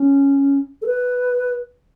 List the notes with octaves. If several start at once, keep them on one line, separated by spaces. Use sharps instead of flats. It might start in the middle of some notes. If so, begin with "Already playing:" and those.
Already playing: C#4
A4
B4